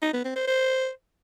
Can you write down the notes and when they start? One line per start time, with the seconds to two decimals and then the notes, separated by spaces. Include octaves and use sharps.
0.02 D#4
0.13 B3
0.25 C4
0.36 C5
0.47 C5